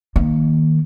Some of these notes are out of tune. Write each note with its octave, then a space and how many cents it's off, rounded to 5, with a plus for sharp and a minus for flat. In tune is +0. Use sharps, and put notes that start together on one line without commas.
D#3 +0 A#3 +0